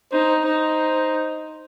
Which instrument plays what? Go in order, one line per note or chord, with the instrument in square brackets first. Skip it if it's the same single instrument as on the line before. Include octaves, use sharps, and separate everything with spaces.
[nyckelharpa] D#4 [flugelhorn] C5
[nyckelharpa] D#4 [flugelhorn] C5